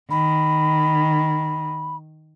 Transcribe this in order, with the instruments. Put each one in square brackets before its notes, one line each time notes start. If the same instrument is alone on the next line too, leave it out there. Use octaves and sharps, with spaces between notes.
[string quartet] D#3 [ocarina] B5